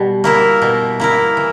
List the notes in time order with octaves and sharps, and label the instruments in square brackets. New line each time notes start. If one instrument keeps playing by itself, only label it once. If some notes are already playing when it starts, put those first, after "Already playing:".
Already playing: [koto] B2 [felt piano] G3
[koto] A#3 E4 A#4
B2
A#3 E4 A#4
E3